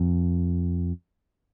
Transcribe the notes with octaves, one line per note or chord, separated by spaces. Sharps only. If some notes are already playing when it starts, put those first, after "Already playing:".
Already playing: F2